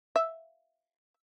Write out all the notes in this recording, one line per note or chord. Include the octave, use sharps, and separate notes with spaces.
E5